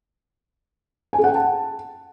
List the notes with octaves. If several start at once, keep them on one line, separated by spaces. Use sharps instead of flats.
G#5
G#4
F#5
G5
A5